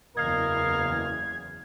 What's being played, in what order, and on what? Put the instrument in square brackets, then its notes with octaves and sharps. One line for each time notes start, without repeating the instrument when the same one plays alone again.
[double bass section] F#1 E2 [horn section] A#4 D#5 F5 [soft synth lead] G#6